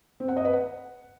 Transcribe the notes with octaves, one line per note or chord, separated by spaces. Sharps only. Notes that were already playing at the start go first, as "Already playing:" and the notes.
C4
F#5
D#5
B4
F#5